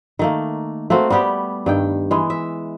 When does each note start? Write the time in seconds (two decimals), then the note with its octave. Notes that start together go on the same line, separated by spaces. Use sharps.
0.19 D#3 A3 A#3
0.90 A3 A#3 C4 F#4
1.10 G3 A3 B3 G4
1.66 G2 D#3 G5
2.11 E3 G#3
2.30 E5